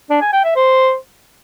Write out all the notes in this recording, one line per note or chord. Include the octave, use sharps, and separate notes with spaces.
D4
G#5
G5
E5
C5